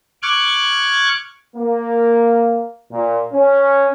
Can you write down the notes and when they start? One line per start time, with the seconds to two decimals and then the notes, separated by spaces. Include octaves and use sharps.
0.23 C#6 D6 F6 F#6 G#6
1.55 A#3
2.91 A#2
3.33 C#4